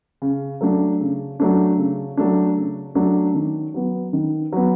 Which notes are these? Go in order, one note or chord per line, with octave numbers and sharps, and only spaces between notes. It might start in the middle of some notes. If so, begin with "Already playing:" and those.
C#3
F#3 A3 D4
C#3
F#3 A3 D4
C#3
F#3 A3 D4
C#3
F#3 A3 D4
D#3
F#3 B3
D#3
F#3 B3